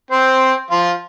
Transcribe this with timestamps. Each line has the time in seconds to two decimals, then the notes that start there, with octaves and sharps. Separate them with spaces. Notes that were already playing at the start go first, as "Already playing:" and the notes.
0.11 C4 C5
0.71 F3 F4